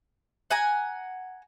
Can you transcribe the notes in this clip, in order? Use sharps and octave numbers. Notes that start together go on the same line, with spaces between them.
F#5 G#5 A#5